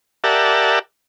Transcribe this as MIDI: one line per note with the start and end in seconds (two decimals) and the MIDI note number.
0.24 0.79 67
0.24 0.79 70
0.24 0.79 74
0.24 0.79 76
0.24 0.79 78
0.24 0.79 81